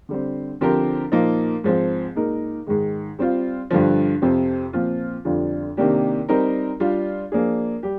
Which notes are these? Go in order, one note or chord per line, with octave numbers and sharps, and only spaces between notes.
D3 G3 C4
D3 F3 C4 G4 A#4
A#2 F3 A#3 D#4
G#2 F3 C4
A#2 G#3 D#4 A#4
G#2 D#3 G#3
G3 C4 F4
G2 D3 F3
F2 C3 F3 C4
A#2 F3 C4 F4
F2 D3 G3 D4 F4
C3 D#3 A#3 D4 G4
G3 C4 D#4 A#4
G3 D4 F4
F3 A#3 D4 G#4
G3 G4